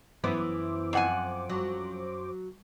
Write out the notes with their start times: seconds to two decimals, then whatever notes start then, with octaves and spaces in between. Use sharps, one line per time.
0.24 F#2 E3 B3 E4 C5 D6
0.93 F2 F#5 G#5
1.49 F#3